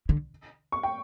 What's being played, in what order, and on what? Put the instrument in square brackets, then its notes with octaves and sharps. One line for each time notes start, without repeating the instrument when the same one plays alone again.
[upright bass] D3
[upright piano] C#6
G5